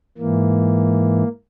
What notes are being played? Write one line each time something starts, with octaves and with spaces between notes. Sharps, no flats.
G#2 E3 A#3